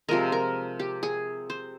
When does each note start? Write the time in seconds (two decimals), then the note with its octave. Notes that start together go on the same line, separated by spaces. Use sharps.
0.09 C3 F3 G#3 A#4
0.32 A#4
0.80 G4
1.03 G#4
1.50 C5